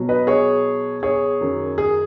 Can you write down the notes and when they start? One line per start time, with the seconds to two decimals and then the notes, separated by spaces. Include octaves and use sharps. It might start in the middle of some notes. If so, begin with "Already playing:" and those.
Already playing: B2 F#3
0.09 B4 D#5
0.27 G#4 C#5
1.03 G#4 C#5
1.41 F#2 D#3 F#3
1.78 G#4